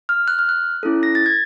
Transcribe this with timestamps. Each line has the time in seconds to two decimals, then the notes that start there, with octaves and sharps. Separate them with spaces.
0.09 F6
0.28 F#6
0.39 F6
0.49 F#6
0.83 C#4 E4 A4
1.03 A#6
1.15 A6
1.26 G#6